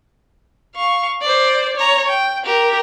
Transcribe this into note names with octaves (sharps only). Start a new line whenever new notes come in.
F5 C#6
C5 D5
C#5 A#5
G5
G4 A#4